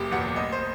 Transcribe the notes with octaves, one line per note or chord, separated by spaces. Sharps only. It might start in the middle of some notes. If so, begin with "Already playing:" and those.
Already playing: F#1 G4
E2 B2 F#3 F#5
A1 D#5
C5